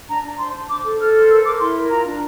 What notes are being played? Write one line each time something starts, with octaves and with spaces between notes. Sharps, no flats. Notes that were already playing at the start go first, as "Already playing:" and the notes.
D4 A#5
D4
C5 C6
D4
C5 D6
A4
A4 F6
C5
A#4 E6
A#4 D6
E4 C6
A#4
F4 A#5
D4